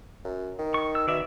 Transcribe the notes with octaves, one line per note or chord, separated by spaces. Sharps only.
F#2
D#3
C#6
E6
B2 D#3 D5 E5